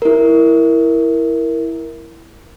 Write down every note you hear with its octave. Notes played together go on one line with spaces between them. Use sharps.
E4 A#4